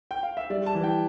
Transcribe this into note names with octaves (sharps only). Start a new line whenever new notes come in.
G5
F5
E5
G3 D5
A5
E3
G5